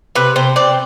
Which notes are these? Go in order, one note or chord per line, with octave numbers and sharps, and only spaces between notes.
C3 B4
C3 C5
C4 D5